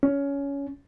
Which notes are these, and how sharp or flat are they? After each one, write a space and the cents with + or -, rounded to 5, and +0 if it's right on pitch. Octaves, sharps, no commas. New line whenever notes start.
C#4 +15